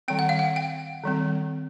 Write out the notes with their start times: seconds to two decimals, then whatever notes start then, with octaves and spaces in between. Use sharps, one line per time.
0.08 D#3 G3 C4 G5
0.19 F#5
0.29 F5
0.39 F#5
0.56 G5
1.04 D#3 G3 C4